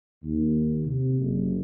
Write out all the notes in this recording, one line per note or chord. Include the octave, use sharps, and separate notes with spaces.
D#2
C3
F#1